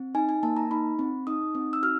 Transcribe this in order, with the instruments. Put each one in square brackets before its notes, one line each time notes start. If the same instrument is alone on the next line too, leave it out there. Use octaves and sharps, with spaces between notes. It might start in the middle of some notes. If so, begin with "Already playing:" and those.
Already playing: [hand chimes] C4
D#4 G#5
G#5
A#3 A5
A#5
D#4 B5
C4
D#4 D#6
C4
E6
F#4 F6